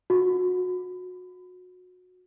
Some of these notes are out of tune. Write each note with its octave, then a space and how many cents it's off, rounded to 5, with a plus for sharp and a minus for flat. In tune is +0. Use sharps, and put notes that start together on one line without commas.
F#4 -25